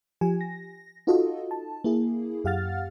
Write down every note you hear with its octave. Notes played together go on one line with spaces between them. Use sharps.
F3 G4 G#5
A#6
D#4 F4 F#4 A4 D#5
A5
A#3 E4 G#4
F#2 G4 F5 F#5 F6 A6